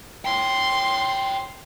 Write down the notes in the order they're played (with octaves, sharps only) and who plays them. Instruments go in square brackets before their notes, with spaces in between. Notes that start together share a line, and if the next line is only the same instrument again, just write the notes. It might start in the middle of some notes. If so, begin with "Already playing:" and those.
[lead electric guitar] C#5 G5 [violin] C6